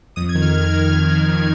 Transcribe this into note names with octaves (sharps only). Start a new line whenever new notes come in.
F2 D#6
G#6
D#3
F6
F2 F6
G#6
D#3
F6
F2
D#3
F2 F6